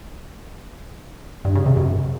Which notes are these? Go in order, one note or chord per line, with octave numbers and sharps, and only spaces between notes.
G2
C#3
C3
F#2